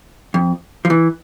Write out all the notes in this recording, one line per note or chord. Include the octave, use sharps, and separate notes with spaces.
F2
F3
E3